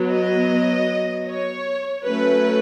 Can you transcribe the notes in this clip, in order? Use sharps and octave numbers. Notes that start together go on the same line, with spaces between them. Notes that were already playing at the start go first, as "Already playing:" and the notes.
Already playing: F#3 B3
D#5
C#5
F#3 A3 C#4 B4